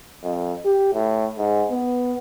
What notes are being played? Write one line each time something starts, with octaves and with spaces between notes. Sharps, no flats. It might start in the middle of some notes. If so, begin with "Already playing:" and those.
F2
G4
A2
G#2
B3